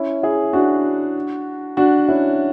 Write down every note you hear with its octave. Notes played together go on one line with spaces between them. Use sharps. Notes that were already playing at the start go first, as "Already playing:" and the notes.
Already playing: C#4 E4
E4 G#4
D4 F#4
D4 F#4
C#4 E4